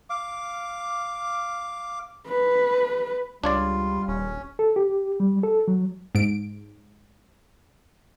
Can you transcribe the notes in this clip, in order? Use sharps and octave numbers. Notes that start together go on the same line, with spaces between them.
F5 D6
B4
C#2 G3 D4 F4 C#5 D5
D#1 C#4
A4
G4
G3
A4
F#3
G#2 D7